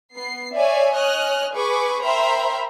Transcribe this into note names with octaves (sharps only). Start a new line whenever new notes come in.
B3 C7
C#5 D5 E5 F5 G#5
C#5 D#5 G#5 F6 F#6
G#4 B4 C#6 D6
A#4 C5 E5 G5 A#5 B5